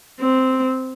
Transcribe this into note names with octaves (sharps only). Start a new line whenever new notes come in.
C4